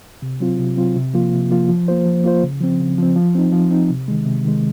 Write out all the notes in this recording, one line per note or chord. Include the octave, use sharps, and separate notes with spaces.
C3
F#3 C4 F4
C3
F#3 C4 F4
C3
F3 A#3 F4
C3
F3 A#3 F4
F3
A#3 F4 C5
F3
A#3 F4 C5
C#3
F3 C4
C#3
F3 C4
F3
C4 D#4
F3
C4 D#4
C3
D#3 G#3
C3
D#3 G#3